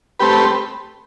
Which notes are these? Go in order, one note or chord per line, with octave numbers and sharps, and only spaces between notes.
A3 C4 G4 B4